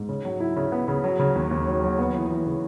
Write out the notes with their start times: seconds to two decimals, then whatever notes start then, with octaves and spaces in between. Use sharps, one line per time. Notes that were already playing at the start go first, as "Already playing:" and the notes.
Already playing: G#2
0.09 C#3
0.25 F#3
0.40 E4
0.56 C#3
0.72 B3
0.88 C#3
1.04 F#3
1.20 C#3
1.35 D#2
1.51 D#2
1.67 F#3
1.84 F#3
1.99 B3
2.15 E3
2.31 E3
2.46 C#3